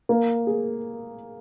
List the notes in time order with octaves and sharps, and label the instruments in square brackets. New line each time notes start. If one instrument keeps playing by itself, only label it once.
[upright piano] A#3
G#4